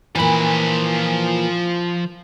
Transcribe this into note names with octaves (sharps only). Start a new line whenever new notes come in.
A#2 E3 F3 B5